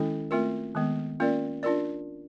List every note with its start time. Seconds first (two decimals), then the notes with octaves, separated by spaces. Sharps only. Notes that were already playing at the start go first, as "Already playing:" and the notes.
Already playing: D#3 G#3 C#4 E4 A4
0.31 A3 C4 F4 A#4
0.75 D#3 G#3 B3
1.20 A#3 C#4 F4 A#4 D5
1.63 D4 F4 A#4 D5